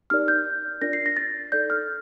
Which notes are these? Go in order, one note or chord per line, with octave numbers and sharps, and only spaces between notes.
D#4 G4 A#4 D5 F6
G6
D4 F4 A#4 D5 A#6
C7
A#6
A6
D#4 A4 D5 G6
F6